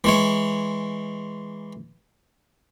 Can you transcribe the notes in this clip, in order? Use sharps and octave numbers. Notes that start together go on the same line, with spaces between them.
E3 G#3 C#5